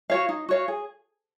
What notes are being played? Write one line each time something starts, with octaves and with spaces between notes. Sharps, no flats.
F#4 C#5 F5
D#4
F#4 C#5 F5
G#4